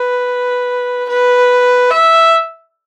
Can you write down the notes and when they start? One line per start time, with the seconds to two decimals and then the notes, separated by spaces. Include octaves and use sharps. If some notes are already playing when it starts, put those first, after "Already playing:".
Already playing: B4
1.08 B4
1.90 E5